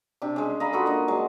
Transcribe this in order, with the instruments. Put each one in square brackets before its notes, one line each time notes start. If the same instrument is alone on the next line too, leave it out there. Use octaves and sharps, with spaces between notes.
[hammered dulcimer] C3 D4 G4
C#3 G#3
D#5 F5 A#5 B5
F4 F#4 A4 B4
A#3 D4 D#5
F#3 G#3